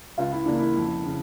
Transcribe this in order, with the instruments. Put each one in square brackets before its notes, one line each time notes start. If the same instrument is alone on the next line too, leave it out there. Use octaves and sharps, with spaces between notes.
[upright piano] C#2 [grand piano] F4
[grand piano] E4
[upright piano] C#3 E3 A#3 [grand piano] D4
[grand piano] E4
[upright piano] F2
C#3